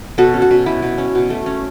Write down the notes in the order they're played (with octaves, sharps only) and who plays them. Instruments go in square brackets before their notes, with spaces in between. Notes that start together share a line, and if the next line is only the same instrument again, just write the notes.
[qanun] B2 F#4 A4
C#4
F#4
B2
B2 E4
B2
C#4
B2
A3
C#4